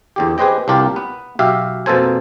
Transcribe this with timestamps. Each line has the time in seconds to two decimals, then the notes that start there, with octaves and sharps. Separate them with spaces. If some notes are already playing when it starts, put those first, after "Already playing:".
0.16 E2 D3 G4
0.38 G4 G#4 B4 C5 D#5 G5
0.68 C2 D4 F4 G4 A#4
0.96 B3 B4
1.39 B1 F#4 G4 E5 F5
1.86 F2 B2 A#3 A4 C5 G#5